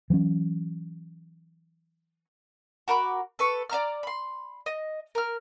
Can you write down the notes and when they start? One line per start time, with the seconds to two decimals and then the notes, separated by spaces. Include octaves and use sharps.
0.10 E3 F#3 A#3 C#4
2.88 F#4 A#4 B5 D6
3.39 A4 B4 C#6
3.70 D5 E5 A#5 F6
4.03 B5 C6
4.66 D#5
5.15 A#4 F6